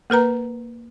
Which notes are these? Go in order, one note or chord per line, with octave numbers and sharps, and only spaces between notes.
A#3 A#4 B4 A#5